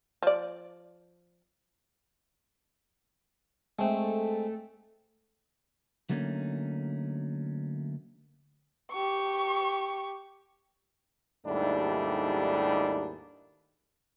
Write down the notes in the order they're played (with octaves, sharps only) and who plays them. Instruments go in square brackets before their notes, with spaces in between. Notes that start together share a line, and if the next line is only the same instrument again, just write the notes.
[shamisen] F3 D5
[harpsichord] G#3 C4 [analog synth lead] A3
[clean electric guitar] D3 F#3 A3 A#3 C#4 D#4
[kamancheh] G4 C#6
[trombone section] D#2 G#2 G3 A3 D4 E4